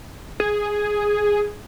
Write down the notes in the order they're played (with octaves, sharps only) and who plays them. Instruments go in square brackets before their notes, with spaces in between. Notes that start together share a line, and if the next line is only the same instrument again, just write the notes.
[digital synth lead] G#4